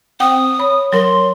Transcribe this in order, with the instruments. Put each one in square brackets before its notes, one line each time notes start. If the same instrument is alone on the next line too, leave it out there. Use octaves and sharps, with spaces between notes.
[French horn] C4 [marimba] F#5 G5 [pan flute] D#6
[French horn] C#5 [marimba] B5
[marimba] F#3 A#4 [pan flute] C6